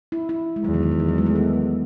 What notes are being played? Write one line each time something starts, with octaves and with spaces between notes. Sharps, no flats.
E4
E4
G#3
E2 F#3
D#3
E3
D#3
E3
F#3
G#3
A3
B3